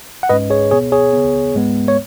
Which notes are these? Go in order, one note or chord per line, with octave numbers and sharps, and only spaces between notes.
F#5
G#2 G#3 C#4 B4 D#5
G#4 C#5
B2 B3 G#4 C#5
G#4 C#5
C#3 B3
G#2 G#3 B3
C#5